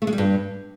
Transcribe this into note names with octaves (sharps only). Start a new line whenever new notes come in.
A3
G#3
G3
G2